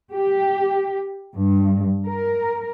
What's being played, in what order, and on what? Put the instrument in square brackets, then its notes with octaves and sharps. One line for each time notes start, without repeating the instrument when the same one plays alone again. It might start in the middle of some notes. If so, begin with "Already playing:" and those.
[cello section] G4
G2
A#4